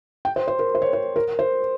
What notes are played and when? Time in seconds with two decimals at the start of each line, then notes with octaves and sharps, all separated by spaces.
0.25 G5
0.36 C5
0.48 C5
0.59 A#4
0.75 C5
0.82 C#5
0.93 C5
1.16 A#4
1.39 C5